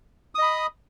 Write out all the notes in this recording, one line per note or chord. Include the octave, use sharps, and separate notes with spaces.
D#5 B5 D#6